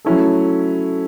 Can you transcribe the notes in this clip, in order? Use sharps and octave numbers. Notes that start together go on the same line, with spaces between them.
F#3 A3 C#4 E4 A4